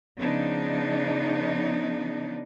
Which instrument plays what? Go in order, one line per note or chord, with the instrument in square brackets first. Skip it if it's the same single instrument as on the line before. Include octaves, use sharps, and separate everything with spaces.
[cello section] C#3 F3 B3 D4 D#4